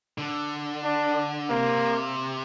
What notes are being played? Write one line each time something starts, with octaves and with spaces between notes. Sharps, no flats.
D3
D4
C3 A#3